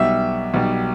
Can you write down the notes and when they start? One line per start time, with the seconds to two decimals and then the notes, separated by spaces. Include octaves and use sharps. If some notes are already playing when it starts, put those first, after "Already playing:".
Already playing: B1 B2 G3 E5
0.54 B1 B2 G3